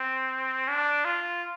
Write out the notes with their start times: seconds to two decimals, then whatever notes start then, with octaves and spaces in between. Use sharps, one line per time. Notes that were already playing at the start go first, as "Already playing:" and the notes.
Already playing: C4
0.68 D4
1.05 F4